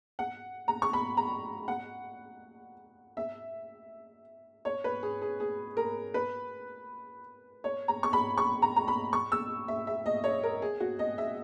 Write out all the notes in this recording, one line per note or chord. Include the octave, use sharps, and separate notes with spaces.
F#5
A#5
C#6
B5
A#5
F#5
E5
C#5
B4
G#4
G#4
G#4
A#4
B4
C#5
A#5
C#6
B5
C#6
A#5
A#5
B5
C#6
E6
E5
E5
D#5
C#5
A#4
G#4
F#4
D#5
E5